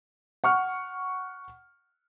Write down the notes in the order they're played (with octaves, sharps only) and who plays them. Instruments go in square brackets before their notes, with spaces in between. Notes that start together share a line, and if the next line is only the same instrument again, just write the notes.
[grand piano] F#5 C#6 F6